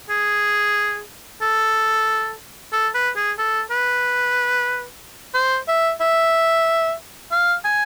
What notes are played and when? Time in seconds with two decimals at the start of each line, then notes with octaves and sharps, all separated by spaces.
0.10 G#4
1.42 A4
2.73 A4
2.94 B4
3.16 G#4
3.38 A4
3.71 B4
5.34 C5
5.68 E5
6.01 E5
7.31 F5
7.64 G#5